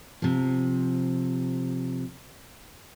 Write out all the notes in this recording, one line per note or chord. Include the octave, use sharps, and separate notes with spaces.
C3 F3